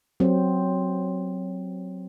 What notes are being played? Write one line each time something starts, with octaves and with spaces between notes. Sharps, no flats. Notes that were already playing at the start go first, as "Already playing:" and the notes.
F#3 C4